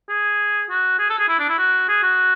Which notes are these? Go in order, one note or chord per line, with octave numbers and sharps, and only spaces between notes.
G#4
F#4
G#4
A4
G#4
E4
D4
E4
F#4
G#4
F#4